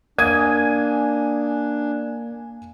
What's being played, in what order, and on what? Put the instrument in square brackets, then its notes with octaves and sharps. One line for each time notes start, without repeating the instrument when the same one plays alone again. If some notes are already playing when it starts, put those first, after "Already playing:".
[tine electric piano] A#3 [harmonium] D4 [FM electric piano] G#5 [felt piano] D#6 G#6 D#7